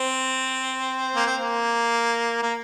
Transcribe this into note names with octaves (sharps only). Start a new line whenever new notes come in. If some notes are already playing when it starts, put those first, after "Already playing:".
Already playing: C4
A#3
C4
A#3
A#3